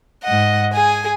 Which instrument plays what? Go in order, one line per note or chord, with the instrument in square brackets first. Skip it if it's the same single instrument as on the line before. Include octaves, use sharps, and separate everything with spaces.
[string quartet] G#2 F#5 [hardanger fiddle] D#5
[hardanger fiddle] G#4 [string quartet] G#5